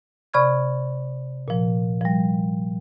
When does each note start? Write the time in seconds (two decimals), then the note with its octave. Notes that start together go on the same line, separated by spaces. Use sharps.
0.34 C3 D5 B5 C#6 F6 G#6
1.48 A#2 F3
2.01 F3 G3